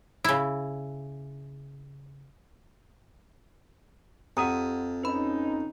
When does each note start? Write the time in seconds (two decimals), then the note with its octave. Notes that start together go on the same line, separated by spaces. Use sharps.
0.24 C#3 E4
4.37 F2 G4 F#5 A#5 D#6 D#7
5.03 C#4 D#4 B4 B5